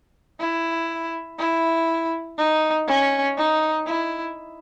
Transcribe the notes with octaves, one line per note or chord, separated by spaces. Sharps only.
E4
E4
D#4
C#4
D#4
E4